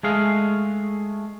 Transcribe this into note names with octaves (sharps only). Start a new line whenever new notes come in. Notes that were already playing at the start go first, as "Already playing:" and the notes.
G#3 A3 G#4 F5